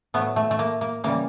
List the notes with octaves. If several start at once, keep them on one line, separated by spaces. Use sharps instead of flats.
A2 F#3 A3 B3
A3
A3
A#3
A#3
C#3 E3 G3 A#3